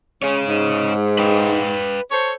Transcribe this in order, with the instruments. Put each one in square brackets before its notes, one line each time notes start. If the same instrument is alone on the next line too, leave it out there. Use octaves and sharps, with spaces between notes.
[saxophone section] G#3 C#4 [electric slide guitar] G#4 C#5
[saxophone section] G#2
[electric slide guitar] B4 F5 G5
[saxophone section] A4 C5 C#5